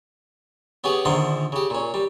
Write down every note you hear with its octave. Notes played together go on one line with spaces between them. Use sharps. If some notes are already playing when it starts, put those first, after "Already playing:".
B3 C#4 G4 G#4
A#1 D3 D#3 F3 F#5 C6
C#3 G4
A#2 C#4
G3